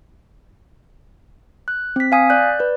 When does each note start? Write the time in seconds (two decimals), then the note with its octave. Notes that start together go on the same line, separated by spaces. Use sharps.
1.68 F#6
1.96 C4 B6
2.12 F5 G#5 D#6 B6
2.30 D5 F#6 G6
2.59 B4 D5